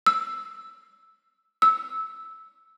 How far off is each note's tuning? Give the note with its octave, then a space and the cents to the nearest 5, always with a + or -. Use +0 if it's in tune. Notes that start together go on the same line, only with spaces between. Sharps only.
E6 +0
E6 -15